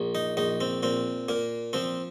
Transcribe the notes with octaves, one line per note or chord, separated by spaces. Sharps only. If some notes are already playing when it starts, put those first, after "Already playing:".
Already playing: A#1
D#4
A#1 D#4
C4
A#2 C4
A#2 A#3
F3 C4